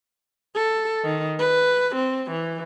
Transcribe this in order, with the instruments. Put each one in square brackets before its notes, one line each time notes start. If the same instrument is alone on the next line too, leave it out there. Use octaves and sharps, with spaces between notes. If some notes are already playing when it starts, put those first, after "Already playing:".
[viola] A4
D#3
B4
C4
E3